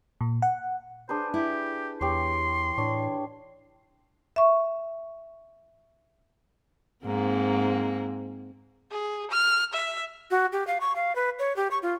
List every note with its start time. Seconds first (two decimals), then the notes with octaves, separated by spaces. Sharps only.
0.21 A#2
0.42 F#5
1.09 D4 G#4 B4 C5
1.34 E4 G4
2.01 E2 E3 G4 C#5 C6
2.78 A2 D4 C#5
4.36 E5 C#6
7.05 G#2 A#3 C4
8.91 G#4
9.31 F6
9.73 E5
10.31 F#4
10.52 G4
10.67 F5
10.81 C#6
10.96 F5
11.16 B4
11.39 C#5
11.56 G4
11.71 C#6
11.82 F4